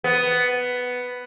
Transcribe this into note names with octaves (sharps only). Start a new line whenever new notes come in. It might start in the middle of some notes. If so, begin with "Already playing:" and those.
B3